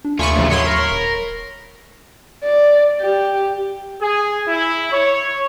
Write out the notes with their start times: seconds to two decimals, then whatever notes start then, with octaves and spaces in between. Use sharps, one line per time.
0.05 D4
0.19 D#2 A3 F4 G#5 B5 C#6
0.35 A#1 C#3
0.50 A2 F#3 C#5 B5 C6
0.67 A#4
0.91 D#1
2.44 D5
3.01 G4
4.02 G#4
4.48 E4
4.92 C#5